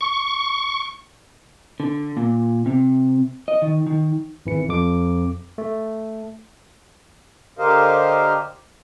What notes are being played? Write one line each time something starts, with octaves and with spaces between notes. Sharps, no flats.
C#6
D3
A#2
C3
D#5
D#3
D#3
G#1 E3 C#7
F2 D6
A3
D3 G4 A#4 C5 D#5 F5